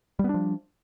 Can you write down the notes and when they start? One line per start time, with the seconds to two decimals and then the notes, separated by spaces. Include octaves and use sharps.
0.19 G3
0.24 B3
0.29 D4
0.34 F3